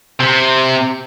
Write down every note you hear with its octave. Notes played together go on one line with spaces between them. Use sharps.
C3